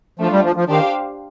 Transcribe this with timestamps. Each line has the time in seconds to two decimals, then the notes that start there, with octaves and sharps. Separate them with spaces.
0.19 F3 A3 D4 F4
0.32 G3
0.44 F3
0.56 F3
0.68 D#3 D4 G4 C5 F5